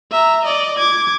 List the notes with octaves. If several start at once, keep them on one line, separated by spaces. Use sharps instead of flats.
E5 A#5
D5 D#5
D6 G#6